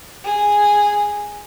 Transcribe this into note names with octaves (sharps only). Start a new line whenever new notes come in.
G#4